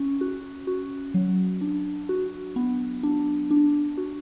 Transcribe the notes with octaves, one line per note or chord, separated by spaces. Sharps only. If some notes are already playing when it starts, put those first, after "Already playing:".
Already playing: C#4
F#4
F#4
F#3
D4
F#4
B3
D4
D4
F#4